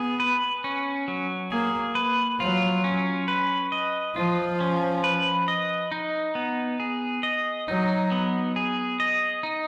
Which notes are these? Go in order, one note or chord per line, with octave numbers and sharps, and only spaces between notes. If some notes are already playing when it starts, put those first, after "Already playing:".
Already playing: B3 G#4
B4
C#4
F#3
A#3 G#4
B4
F#3 F4
C#4
B4
D#5
F3 F4
C#4
B4
D#5
D#4
B3
G#4
D#5
F#3 D#4
B3
G#4
D#5
D#4